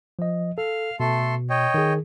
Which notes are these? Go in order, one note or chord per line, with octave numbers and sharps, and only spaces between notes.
F3 D#5
A4 F5
B2 A3 A4 C6
C#5 D#5 G5
D#3 G#4